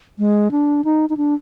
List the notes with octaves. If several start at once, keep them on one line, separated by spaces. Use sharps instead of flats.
G#3
D4
D#4
D#4
D4